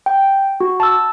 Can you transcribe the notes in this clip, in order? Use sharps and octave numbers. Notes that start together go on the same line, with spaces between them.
G5
F#4
A5 E6